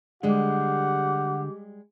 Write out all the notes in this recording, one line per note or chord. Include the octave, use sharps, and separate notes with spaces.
D3 G3 G#3 G4 F#5